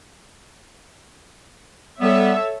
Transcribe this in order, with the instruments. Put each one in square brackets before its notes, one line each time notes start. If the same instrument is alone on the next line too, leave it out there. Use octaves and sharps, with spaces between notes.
[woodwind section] G3 B3 [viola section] A4 C#5 E5